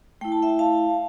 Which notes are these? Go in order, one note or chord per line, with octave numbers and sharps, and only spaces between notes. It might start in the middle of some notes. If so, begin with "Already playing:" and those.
A3 E4 G5
A5
E5 G5
F5 A5